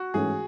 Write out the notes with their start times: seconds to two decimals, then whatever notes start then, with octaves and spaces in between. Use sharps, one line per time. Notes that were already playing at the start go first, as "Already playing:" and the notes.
Already playing: F#4
0.14 G#2 E3 A3 C#4 G#4